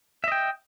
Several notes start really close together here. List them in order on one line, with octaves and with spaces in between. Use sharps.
E5 D#5 G5